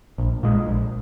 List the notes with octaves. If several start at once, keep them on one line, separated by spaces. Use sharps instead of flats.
A#1
A#2 G#3
A#1